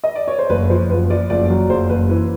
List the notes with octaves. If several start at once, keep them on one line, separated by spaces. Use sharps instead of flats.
D#5
D5
C#5
C5
F#1 B4
F3 C5
F#1 B4
F3 D5
F#1 D5
F#2
F#1 C5
F#1 B4
E3 B4